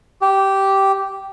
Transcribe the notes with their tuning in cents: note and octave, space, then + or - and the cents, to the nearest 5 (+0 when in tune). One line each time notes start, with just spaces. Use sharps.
G4 -10